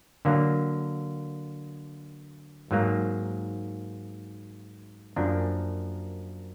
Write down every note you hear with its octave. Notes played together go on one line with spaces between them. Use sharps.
D3 F#3 A#3
G#2 F#3 A#3
F#2 F3 A#3 D4